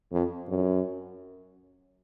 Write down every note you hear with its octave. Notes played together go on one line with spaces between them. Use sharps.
F2
F#2